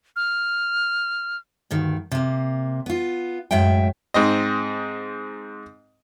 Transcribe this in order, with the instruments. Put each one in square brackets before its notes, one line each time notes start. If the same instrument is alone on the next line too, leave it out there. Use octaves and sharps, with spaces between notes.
[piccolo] F6
[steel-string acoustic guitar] D2 G2 D#3
C3 A#3
B3 F4
F#2 A2 G#3 E5 G5
[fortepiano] G#2 C4 D#5